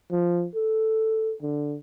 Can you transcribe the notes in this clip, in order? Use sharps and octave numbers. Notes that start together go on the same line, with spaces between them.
F3
A4
D3